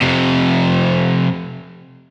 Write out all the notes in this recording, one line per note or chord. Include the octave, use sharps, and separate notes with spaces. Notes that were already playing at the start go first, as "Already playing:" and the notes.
F2 C3